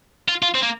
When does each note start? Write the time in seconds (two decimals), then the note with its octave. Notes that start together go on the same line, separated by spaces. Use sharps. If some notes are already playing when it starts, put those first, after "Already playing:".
0.29 F4
0.42 F4
0.55 C4
0.62 A#3